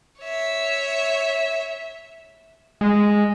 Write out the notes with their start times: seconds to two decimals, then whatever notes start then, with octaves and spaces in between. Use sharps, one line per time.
0.21 C#5 E5
2.81 G#3